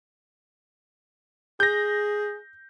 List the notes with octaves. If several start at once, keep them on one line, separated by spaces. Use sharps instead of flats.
G#4 G6 A#6